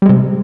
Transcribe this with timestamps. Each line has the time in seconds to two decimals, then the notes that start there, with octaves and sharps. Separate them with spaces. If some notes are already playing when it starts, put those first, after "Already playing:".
0.02 G3
0.06 G#3
0.09 C3